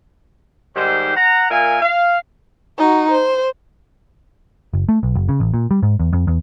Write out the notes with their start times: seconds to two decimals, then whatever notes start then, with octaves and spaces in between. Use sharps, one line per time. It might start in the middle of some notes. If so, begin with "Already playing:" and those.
0.75 G#2 D#3 G3 G4 C5
1.16 F#5 A#5
1.50 A#2 A#4 E5 F5 G#5
1.81 F5
2.78 D#4 F#4
3.12 C5
4.74 F#1
4.89 A3
5.03 B1
5.15 F#1
5.29 C#3
5.40 A1
5.54 A#2
5.71 G3
5.83 G#2
6.00 E2
6.13 F2
6.27 E2